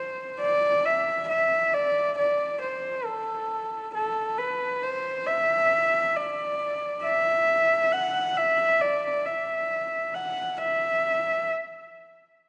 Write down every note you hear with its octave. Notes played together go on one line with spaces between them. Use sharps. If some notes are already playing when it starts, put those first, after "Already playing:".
Already playing: C5
D5
E5
E5
D5
D5
C5
A4
A4
B4
C5
E5
D5
E5
F#5
E5
D5
E5
F#5
E5